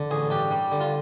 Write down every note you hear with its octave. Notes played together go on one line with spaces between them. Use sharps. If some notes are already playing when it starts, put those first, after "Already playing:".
Already playing: D3
A1 G#4
G2 G4
G3
D3
F4